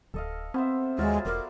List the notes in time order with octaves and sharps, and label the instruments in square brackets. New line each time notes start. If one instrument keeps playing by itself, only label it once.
[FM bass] D1 [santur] A4 D#5 F5
[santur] B3 C5 E5 [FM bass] C4
[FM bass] D#2 [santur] F#3 F4 E5 [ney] G#3
[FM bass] E1 [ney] A#4 [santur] D5 D6